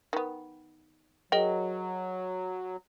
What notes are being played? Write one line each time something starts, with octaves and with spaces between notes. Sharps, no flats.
D#3 B3
F#3 G#4 A#4 D#5 G5